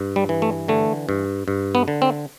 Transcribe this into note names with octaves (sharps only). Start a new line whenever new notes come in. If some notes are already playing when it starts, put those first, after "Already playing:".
Already playing: G2
G3
E3
A3
D3 A3
G2
G2
B3
D3
C4